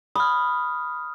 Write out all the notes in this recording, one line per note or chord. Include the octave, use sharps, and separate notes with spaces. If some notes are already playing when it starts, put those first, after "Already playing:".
B5 D#6 F6